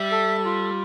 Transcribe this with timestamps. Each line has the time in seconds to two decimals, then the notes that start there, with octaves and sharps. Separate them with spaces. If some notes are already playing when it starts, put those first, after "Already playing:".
Already playing: G3 E5
0.11 A4
0.45 F4